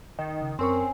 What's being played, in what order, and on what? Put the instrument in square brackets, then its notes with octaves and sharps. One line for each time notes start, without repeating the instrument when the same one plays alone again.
[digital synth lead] D#3
[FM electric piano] C#3
[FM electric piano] F#2 A#4 C#6 [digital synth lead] C4 [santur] C#4